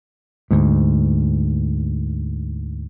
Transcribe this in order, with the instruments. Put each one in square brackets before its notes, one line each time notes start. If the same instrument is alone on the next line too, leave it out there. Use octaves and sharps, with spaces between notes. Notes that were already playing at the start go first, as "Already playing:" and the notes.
[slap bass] D2 G#2